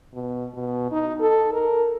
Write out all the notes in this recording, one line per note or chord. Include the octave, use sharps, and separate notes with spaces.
B2
B2
D#4
A4
A#4